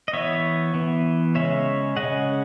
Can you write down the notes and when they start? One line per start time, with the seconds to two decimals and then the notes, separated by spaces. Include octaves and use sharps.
0.08 D#5
0.13 E3 B3 C#5 E5
0.74 E3 B3
1.35 C#3 G#3 C#4 C#5 E5
1.96 C#3 G#3 C#4 D#5 F#5